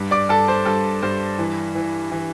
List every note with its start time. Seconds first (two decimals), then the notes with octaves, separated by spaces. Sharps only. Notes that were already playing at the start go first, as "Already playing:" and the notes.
Already playing: G2
0.11 D5 D6
0.29 G2 A4 A5
0.48 C5
0.65 G2 A4
1.03 G2 C5
1.39 E3
1.75 E3
2.12 E3